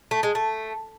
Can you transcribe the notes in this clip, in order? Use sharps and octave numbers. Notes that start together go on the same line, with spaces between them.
A3
G#3
A3